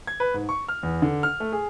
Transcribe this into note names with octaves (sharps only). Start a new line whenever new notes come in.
G#6
B4
G#2
C#6
F6
E2
D3
F6
A3
G#4